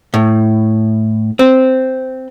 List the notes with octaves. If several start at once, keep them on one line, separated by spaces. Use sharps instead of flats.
A2
C4